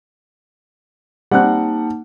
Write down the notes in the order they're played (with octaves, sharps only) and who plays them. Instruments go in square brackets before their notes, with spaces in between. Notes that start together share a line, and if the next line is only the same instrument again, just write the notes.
[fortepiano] G3 C4 F#6 [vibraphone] A#3 D#4 A5 [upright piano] F#5